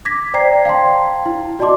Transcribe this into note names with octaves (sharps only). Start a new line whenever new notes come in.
D6 G#6 A#6 B6
C5 D5 G5 A#5 G#6 C7
F5 G5 A5 C6
E4
F#4 D5 D#5 A5 C6 D6